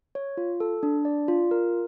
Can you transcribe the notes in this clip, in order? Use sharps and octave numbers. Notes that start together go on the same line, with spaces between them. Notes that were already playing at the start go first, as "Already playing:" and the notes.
C#5
F4
A4
D4
D5
F4
A#4